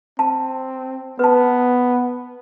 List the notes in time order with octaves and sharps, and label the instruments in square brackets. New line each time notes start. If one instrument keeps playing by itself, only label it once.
[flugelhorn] C4 [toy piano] A5
[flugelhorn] B3 [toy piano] B4 A5